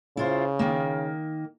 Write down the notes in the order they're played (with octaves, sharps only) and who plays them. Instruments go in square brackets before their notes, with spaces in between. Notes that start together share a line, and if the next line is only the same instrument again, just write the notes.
[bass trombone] C#3 [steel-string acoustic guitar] E4 F4 C5
[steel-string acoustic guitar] D#3 A#3